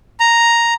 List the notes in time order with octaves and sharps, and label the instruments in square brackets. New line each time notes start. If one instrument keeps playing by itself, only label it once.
[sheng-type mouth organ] A#5